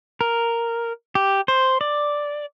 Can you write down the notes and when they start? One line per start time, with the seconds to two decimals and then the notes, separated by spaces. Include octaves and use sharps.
0.21 A#4
1.15 G4
1.48 C5
1.81 D5